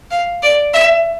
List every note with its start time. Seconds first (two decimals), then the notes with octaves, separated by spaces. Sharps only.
0.11 F5
0.43 D5
0.73 E5